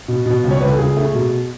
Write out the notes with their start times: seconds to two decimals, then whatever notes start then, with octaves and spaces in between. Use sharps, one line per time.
0.08 B2
0.26 B2
0.44 C#2
0.51 C#5
0.61 C#2 B4
0.69 A4
0.78 C#2 G#4
0.97 A3
1.14 B2